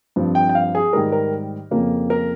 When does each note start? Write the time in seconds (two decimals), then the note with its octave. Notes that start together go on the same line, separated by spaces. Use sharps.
0.16 G2 F3 C4
0.35 G5
0.49 G5
0.55 F5
0.75 G#4
0.93 G#2 D#3 G3 A#4
1.12 A#4
1.71 F2 C#3 F3 A#3
2.10 A#4